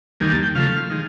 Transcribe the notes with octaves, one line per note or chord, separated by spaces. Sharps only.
D#2 D#3 G3 A#3 G#5
A5
G5
C#3 F3 A3 F5
D#3 G#3